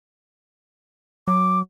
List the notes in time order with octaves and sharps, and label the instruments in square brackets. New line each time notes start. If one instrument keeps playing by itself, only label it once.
[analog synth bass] F#3 [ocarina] D6